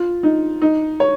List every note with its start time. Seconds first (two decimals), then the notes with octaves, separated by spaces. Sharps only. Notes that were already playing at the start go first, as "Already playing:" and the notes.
Already playing: F4
0.23 D#4
0.62 D#4
1.00 C#5